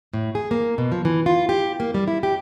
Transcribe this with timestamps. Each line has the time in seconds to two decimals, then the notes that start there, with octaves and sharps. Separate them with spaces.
0.13 A2
0.35 G#4
0.51 A#3
0.78 B2
0.92 F3
1.05 E3
1.26 F4
1.49 G4
1.80 A#3
1.94 G3
2.08 E4
2.23 G4